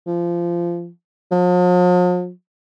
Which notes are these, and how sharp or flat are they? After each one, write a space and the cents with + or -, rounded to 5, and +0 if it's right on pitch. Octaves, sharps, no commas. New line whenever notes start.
F3 -20
F3 +45